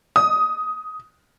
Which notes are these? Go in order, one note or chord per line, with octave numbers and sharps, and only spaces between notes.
D#6